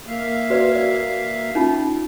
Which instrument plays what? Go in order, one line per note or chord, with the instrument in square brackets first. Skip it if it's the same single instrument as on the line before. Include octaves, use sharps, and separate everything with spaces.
[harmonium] A#3 E5 F5
[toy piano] F#4 B4 D5
D5
C#4 D#4 F4